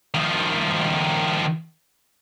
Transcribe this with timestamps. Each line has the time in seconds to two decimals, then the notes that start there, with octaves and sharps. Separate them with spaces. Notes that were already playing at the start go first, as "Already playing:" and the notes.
0.14 D#3 F3